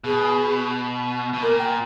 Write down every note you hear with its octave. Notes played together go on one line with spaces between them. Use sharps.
B2 G#4
B2
A#2 A#4
G5